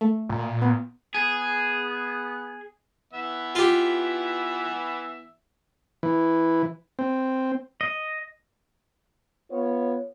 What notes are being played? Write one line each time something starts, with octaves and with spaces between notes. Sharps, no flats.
A3
A#2
B3
B3 G#4
E3 B3 E5
F4 G4
E3
C4
D#5
B3 F4 C#5